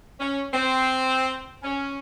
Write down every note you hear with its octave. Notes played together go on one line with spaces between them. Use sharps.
C#4
C4
C#4